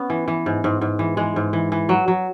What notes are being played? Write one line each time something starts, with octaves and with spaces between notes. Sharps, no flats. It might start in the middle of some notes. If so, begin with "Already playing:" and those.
Already playing: B3 C#4
E3
E3
G#2
G#2
G#2
E3
E3 G#3
G#2
E3
E3
F#3
F#3